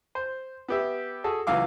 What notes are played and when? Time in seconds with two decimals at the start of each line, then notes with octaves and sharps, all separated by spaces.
0.15 C5
0.69 B3 G4 E5
1.24 F#4 G#4 A4
1.47 C#2 E3 F#3 F5 D6